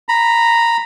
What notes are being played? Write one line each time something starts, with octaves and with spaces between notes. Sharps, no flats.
A#5 B5